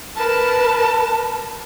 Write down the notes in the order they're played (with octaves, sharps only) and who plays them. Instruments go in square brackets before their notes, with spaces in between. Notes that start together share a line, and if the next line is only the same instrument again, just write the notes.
[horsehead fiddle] A#4 B4 [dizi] A5